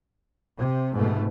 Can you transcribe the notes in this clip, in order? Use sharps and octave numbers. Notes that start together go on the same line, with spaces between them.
C3
F1 G#2 B2 A3